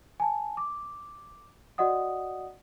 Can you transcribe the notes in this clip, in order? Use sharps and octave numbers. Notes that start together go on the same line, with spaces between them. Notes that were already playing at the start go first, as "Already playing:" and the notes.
G#5 A5
D6
F#4 D5 D#5 F#5 D#6